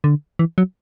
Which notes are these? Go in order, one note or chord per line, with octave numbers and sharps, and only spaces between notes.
D3
E3
F#3